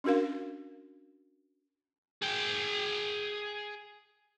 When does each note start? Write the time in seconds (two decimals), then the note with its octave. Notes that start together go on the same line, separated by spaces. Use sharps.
0.04 C#4 D4 F#4 A#4 F5
2.22 G#4 G5